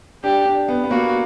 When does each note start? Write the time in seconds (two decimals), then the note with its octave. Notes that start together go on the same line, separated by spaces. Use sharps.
0.24 D4 G4
0.46 D4
0.68 B3
0.84 B3
0.91 A#3 F#4